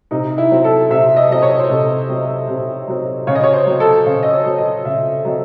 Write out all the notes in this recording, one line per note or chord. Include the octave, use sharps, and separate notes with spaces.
C3 D#4
E4
F#3 C4
A4
C3 E5
D#5
F#3 C4 D#5
C#5
C5
C3 A4
F#3 C4
C3
F#3 C4
C#3 C#5
D#5
C#5
C5
F#3 C4
A4
C#3 C5
D#5
C#5
F#3 C4
D#5
C#3 E5
F#3 C4 D#5